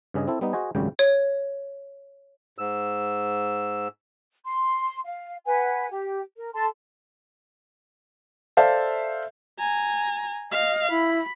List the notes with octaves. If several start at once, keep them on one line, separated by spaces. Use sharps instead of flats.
G2 C#3 G#4 D#5
C4 E4 A4
G3 B3 D#4
F#4 G#4 C5 D#5 G#5
G#1 C#2 F#2 C#3 G3 G5
C#5
G#2 E6
C6
F5
B4 F#5 G#5
G4
A#4
A4 A5 C6
A4 C5 D5 E5 F5 A5
G#5 A#5
D#5 F5
E4 B5